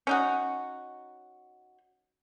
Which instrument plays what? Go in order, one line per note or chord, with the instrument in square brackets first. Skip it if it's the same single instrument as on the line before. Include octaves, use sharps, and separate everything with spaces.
[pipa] C#4 D#4 F#4